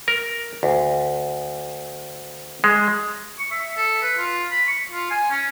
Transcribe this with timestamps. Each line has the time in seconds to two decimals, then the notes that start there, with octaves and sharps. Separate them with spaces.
0.08 A#4
0.63 D2
2.64 G#3
3.39 C#6
3.51 E5
3.77 A4
4.02 B4
4.18 F4
4.51 B5
4.67 C#6
4.91 F4
5.10 G#5
5.31 C#4